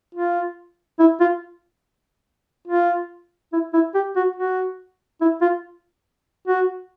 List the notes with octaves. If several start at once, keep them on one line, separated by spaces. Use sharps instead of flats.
F4
E4
F4
F4
E4
E4
G4
F#4
F#4
E4
F4
F#4